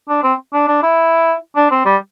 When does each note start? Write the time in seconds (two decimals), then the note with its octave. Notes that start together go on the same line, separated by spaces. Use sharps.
0.09 D4
0.23 C4
0.53 D4
0.68 D4
0.83 E4
1.56 D4
1.71 C4
1.86 G3